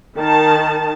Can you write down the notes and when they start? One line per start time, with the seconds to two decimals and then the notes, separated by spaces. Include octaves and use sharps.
0.16 D#3 A5